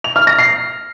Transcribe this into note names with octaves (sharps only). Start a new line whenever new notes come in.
F7
F6
A#6
C7